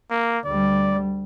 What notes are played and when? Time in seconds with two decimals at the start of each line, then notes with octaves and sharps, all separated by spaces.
0.11 A#3
0.45 D2 G3 D5